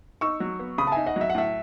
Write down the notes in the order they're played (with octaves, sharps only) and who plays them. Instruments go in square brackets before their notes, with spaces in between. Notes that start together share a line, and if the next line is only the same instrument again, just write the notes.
[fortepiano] D#4 [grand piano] C#6 E6
[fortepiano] F#3
B3
[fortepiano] C#3 [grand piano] B5 D#6
[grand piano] A5
[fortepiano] D#4 [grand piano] E5 G#5
[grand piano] D#5 F#5
[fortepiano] F#3
[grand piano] E5
F#5
[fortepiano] A2 [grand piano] E5